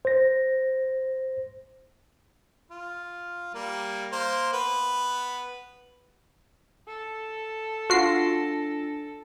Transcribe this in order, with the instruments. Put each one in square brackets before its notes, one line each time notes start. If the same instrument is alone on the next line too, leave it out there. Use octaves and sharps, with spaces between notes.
[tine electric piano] C5 A#6
[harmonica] F4
G3 A#3
A#3 C5
B3 B4
[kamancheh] A4
[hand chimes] D4 A#6 D7 [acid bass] F4 [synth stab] F#4 C7